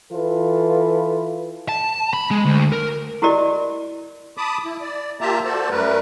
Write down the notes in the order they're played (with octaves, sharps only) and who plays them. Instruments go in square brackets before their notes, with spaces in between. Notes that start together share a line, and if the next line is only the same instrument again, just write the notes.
[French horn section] E3 F4 A4 B4
[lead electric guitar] A5
B5
G#3
D2
A#4
[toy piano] E4 F#4 G4 A#4 D5 D#5
[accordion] A5 B5 D6 D#6
E4
D5
A#3 F4 G4 E5 A5 A#5
F#4 A4 C5 D5 A5
F#2 G3 A3 A#4 B4